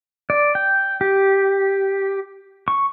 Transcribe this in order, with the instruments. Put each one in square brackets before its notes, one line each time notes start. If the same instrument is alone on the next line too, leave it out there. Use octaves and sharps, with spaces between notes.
[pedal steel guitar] D5
G5
G4
C#6